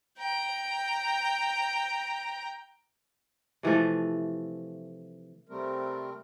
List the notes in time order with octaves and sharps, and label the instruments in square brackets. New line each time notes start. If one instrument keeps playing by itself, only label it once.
[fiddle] G5 A#5
[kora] C3 E3 F3 A3
[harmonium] C3 G3 A3 C4 A#4